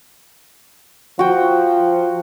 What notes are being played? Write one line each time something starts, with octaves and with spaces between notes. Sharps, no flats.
F3 F#4 G5